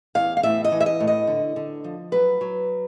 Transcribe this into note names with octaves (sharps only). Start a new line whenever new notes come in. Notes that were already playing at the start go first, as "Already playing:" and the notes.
E2 F5
F5
A2 E5
D#5
E3
E5
D#5
A2
D#5
D3
D3
F3
F#3 B4
F#3